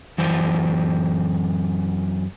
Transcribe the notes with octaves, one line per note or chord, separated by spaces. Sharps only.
F#2 E3 C5